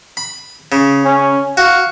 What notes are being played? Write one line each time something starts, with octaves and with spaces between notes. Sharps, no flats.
B5
C#3
C#4
F#4 F5